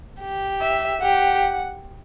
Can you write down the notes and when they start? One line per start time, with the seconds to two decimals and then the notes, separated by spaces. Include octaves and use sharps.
0.20 G4
0.61 E5
1.01 G4 F#5